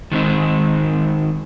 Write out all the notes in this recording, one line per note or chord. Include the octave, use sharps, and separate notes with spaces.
D#3 G#3 C4 D#4